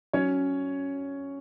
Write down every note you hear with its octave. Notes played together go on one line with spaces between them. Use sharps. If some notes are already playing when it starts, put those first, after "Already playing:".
F#3 C#4 C#5